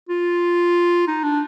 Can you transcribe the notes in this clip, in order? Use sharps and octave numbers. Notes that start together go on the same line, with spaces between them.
F4
D#4
D4